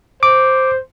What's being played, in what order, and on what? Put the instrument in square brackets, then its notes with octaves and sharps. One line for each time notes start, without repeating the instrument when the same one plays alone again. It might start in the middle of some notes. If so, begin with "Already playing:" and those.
[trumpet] C5 [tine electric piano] D6